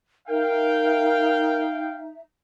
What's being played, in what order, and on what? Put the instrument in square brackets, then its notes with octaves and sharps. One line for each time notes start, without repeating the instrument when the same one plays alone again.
[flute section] D#4 E5 [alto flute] A#4 [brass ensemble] F5 G5